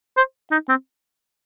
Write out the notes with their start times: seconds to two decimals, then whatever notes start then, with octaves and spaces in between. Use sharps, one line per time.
0.17 C5
0.52 D#4
0.69 C4